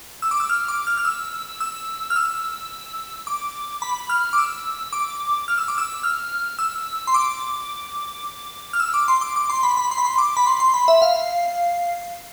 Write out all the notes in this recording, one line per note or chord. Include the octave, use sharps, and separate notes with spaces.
E6
D6
E6
F6
D6
F6
F6
E6
E6
F6
E6
D6
B5
F6
D6
E6
D6
F6
E6
D6
E6
F6
E6
C6
D6
F6
E6
D6
C6
D6
D6
C6
B5
B5
C6
B5
C6
D6
B5
C6
C6
B5
E5
F5